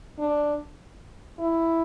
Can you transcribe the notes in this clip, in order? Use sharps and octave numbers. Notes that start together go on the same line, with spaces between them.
D4
E4